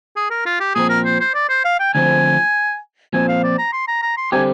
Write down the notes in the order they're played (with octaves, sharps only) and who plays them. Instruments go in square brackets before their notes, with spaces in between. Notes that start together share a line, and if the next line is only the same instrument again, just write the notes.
[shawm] G#4
A#4
F4
G4
[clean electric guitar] A#2 F3 C4 [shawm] G#4
[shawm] A#4
C5
C5
D5
C5
F5
G5
[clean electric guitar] D2 D3 F3 C4 [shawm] G#5
[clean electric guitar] A#2 F3 C4 [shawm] G#5
[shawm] F5
D5
A#5
C6
A#5
A#5
C6
[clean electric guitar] D3 G3 C4 G4 [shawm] G#5